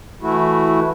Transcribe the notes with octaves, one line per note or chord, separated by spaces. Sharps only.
E3 A3 E4 F#4